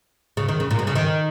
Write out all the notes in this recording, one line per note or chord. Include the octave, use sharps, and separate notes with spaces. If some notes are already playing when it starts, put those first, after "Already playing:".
C#3
D#3
C#3
A#2
B2
C#3
D#3